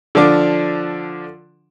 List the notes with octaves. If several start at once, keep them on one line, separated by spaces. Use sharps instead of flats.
D3 F3 D4 D6